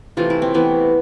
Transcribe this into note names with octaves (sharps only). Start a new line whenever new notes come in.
C3 E3 A3 F4
E4
C4
C3 E3 A3 B3